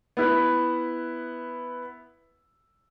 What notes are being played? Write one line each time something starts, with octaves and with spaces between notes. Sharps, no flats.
B3 E4